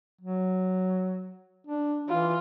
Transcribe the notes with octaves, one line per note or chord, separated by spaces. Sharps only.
F#3
D4
E3 F4